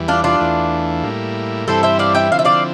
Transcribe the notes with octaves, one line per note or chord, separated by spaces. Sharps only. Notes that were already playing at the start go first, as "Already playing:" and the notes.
Already playing: E2 E3 G3
D4 F4
D4 F4
E2 E3 A3
A2 G3 A#3 E4
G2 E3 G3 C4 E4 A4 C5
C5 E5
D5 F5
E5 G5
D3 F3 C4 E4 F5
E5
D5 F5